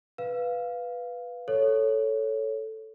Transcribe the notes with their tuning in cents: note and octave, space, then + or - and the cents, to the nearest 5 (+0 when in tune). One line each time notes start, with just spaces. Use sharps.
B4 +0 F5 +0
A4 +0 C#5 +0